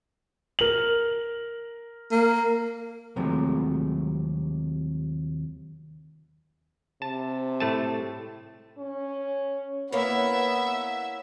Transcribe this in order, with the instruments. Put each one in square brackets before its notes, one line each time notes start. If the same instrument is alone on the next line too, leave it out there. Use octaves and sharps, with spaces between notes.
[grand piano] A#4 F#7
[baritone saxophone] A#3
[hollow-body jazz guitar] D#2 C3 F3 F#3 G#3 A3
[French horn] C3 [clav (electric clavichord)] A5
[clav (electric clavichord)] A2 A3 A5
[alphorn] C#4
[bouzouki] A#3 E4 C#5 [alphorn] B3 [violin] E5 F#5